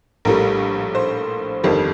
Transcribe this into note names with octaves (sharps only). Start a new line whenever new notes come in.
A#1 A2 G3 A#4
C5
G1 F2 D#3 G3